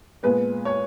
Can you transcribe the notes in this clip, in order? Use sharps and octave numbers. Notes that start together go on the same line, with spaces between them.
A#2 G#3 B3 B4
C#5